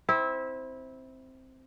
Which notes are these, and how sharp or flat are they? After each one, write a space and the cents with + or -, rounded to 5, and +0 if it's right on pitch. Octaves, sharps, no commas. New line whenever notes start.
C4 +0 E4 -20